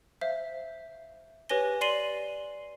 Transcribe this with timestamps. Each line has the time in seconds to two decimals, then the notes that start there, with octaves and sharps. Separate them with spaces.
0.21 C5 E5 F5
1.49 G4 B4 C#5 G#5 A#6 G7
1.81 D5 C6 C7 D#7 F#7 G7